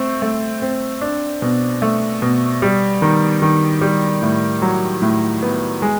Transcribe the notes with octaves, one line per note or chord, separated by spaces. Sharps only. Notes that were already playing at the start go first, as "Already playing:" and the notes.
Already playing: A3 C4
A3
C4
D4
B2
A3
B2
G3
D#3
D#3
G3
A2
F#3
A2
B3
G#3